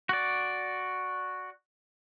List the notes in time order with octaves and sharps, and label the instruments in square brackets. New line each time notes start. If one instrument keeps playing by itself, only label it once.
[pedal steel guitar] F#4 D5